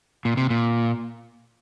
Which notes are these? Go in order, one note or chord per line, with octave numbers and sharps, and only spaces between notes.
A#2
C3
A#2